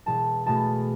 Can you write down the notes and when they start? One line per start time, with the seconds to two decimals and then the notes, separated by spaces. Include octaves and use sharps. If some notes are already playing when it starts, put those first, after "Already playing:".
0.06 E1 A5
0.46 E2 B2 A3 A5